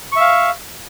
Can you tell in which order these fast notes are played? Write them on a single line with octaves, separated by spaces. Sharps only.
C#6 E5 F5